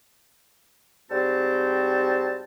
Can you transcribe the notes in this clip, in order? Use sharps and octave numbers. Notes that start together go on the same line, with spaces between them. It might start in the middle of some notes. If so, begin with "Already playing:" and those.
G#2 G3 C4 F#4 C5 A5